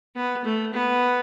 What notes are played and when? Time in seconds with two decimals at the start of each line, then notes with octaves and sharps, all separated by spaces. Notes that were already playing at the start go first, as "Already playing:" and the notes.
0.16 B3
0.45 A3
0.74 B3